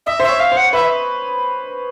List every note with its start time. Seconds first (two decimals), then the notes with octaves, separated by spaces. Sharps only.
0.06 D#5 E5
0.20 C5 E5
0.29 C#5
0.40 F5
0.52 C5
0.57 F#5
0.73 B4 E5